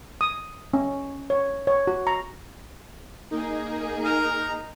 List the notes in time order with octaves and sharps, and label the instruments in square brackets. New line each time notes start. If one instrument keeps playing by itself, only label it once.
[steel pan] D#6
C#4
C#5
C#5
F#4
A#5
[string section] A#3 G#4 [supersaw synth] D#4
[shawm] A#4 [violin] A#5